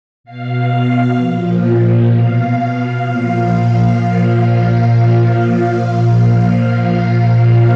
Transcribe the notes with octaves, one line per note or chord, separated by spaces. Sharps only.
B2 F5
A#2 F3
B2 F5
A#2 F3